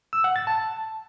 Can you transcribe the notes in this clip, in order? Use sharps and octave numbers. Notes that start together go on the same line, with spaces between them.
E6
F#5
A6
A5